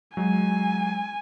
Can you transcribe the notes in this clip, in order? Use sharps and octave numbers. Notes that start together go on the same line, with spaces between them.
F#3 G#3 G#5